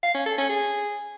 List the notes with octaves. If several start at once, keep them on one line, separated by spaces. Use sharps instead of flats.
F5
C#4
A4
C#4
G#4